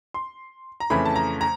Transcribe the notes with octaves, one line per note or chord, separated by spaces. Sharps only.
C6
A#5
F2 C#3 E3 A3 B5
A5
A#5
A#5